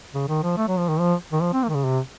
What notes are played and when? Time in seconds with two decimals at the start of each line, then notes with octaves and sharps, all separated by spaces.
0.14 C#3
0.29 D#3
0.43 F3
0.57 A3
0.68 F#3
0.78 F3
0.89 D#3
1.00 F3
1.33 D#3
1.42 F3
1.53 C4
1.63 A#3
1.69 D#3
1.74 C#3
1.85 C3